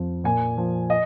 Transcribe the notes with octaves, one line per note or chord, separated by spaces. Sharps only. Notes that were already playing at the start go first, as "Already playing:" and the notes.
Already playing: F2 F3
A#2 G#5
F3
D#5